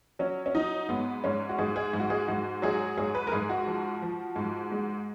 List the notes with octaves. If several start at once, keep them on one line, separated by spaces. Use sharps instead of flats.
F#3 C#4
C#4
F#3 D#4
G#2 B3
G#2 C#4
F#4
G#2 G#4
G#4
G#2
F#4
G#4
G#2 F#4
F#3 G#4
G#2 G#4
B4
A#4
G#2 G#4
F#4
F3
F3
G#2
G#3